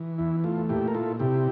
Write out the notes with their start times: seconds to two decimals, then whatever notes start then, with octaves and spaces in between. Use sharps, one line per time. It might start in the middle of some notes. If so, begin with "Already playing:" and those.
Already playing: E3
0.18 E2 E4
0.44 A3 F4
0.69 A#2 E4 G4
0.88 A#4
0.95 E4 F4 A4
1.19 C3 E4 G4